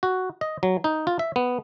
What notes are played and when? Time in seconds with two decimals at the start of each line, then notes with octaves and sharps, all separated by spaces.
0.03 F#4
0.41 D#5
0.63 F#3
0.84 D#4
1.07 F4
1.19 E5
1.36 B3